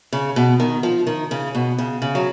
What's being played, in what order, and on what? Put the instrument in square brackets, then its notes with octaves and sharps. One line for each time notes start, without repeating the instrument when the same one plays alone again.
[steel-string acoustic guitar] C#3
B2
D#3
F3
D#3
C#3
B2
C#3
C#3
F#3